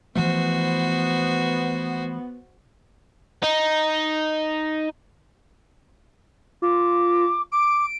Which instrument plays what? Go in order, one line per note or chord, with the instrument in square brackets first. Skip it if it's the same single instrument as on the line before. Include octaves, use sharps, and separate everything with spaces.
[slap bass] E3 F3 A3 [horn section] B3 [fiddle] F#4 C5
[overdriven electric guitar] D#4
[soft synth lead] F4 [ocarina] D6
[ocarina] D6 [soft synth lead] D7